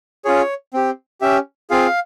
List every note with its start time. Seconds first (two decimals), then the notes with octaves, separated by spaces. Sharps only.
0.25 C#4 F4 G#4 C#5
0.74 C4 G4
1.21 C#4 G4 E5
1.70 C4 F4 G#4 F5